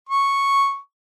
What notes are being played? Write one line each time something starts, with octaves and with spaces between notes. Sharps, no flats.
C#6